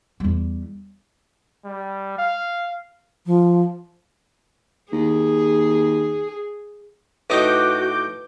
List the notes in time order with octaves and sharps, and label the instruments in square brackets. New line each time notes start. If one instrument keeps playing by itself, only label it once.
[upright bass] E2 G3
[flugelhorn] G3
F5
[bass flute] F3
[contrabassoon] D#2 [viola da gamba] G#4
[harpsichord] A2 D#4 [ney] F#4 [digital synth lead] B4 [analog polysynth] D6 G6